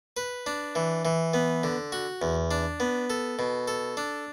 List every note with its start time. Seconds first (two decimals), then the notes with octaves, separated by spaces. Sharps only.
0.17 B4
0.46 D4
0.75 E3
1.05 E3
1.34 B3
1.63 D3
1.92 F#4
2.22 E2
2.51 D4
2.80 B3
3.10 A4
3.39 B2
3.68 A4
3.97 D4